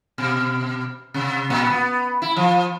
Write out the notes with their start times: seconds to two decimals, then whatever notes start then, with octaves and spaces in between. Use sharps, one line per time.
0.18 B2
1.14 C3
1.50 A#2
1.70 B3
2.22 E4
2.36 F3